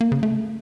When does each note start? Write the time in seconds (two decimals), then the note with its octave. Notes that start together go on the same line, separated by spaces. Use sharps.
0.01 A#3
0.12 C#3
0.23 A3